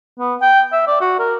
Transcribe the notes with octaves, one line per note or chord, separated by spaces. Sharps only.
B3
G5
E5
D5
F#4
A#4